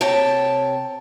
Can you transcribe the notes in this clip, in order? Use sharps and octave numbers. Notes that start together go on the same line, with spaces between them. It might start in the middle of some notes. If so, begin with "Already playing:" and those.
C3 C#5 G5 A5